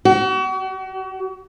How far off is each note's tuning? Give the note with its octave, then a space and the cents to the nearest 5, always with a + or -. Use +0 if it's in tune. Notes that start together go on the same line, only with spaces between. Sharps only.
F#4 +40